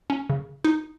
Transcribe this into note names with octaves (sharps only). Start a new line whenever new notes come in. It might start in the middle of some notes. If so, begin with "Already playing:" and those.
C#4
C#3
D#4